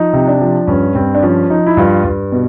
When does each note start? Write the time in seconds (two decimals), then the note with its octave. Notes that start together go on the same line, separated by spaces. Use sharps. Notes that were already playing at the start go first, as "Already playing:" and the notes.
Already playing: F3 D#4
0.13 C3
0.27 D4
0.40 F3
0.68 G2 C#4
0.95 G2 C4
1.15 D4
1.22 F3 C#4
1.50 F3 D#4
1.66 E4
1.77 G2 F4
2.04 G2
2.32 B2